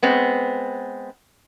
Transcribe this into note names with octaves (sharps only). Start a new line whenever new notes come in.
G#3 B3 C4